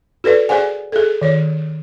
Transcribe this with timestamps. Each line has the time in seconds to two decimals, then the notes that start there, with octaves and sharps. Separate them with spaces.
0.24 F#4 A4 B4 D5
0.49 G#4 C5 D5 F#5 G#5
0.92 G#4 A4
1.22 D#3 C#5